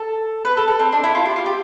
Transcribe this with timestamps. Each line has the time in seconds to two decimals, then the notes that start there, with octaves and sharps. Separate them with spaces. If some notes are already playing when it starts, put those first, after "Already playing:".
Already playing: A4
0.45 B4
0.57 A4
0.68 A4
0.79 C4
0.92 D4
1.04 E4
1.15 F4
1.26 G4
1.36 F4
1.46 G4